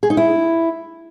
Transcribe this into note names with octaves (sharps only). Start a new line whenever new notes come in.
G#4
D#4
E4